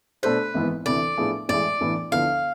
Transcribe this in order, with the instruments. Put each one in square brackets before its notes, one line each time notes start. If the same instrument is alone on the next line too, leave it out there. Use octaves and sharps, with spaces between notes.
[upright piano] B2 A3 D4 A4 C5 [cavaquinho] B4
[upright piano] G#1 G#2 E3 B3
[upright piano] D2 C3 E3 [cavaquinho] D5
[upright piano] A2 F3 B3 D4 G#4
[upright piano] A1 A2 G#3 [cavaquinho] D5
[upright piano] A1 A2 E3 B3 D4
[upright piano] D2 D3 F3 B3 E4 [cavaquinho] F5